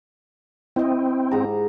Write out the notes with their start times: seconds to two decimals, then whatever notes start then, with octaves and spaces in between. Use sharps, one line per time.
0.76 C4 E4 D#5
1.31 G#2 G4 A#5